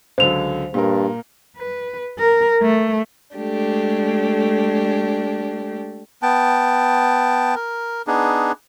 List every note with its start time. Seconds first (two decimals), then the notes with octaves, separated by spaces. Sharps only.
0.18 C#2 D3 F#3 C5 F7
0.74 G2 A#2 A#4
1.57 B4
2.19 A#4
2.62 A3
3.36 G#3 A3 D4 G4
6.22 B3 G5 A5
7.55 A#4
8.07 B3 D4 D#4 G#4